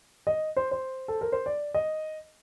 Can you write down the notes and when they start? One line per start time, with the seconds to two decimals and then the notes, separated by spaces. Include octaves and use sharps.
0.27 D#5
0.57 C5
0.71 C5
1.08 A4
1.21 A#4
1.32 C5
1.46 D5
1.74 D#5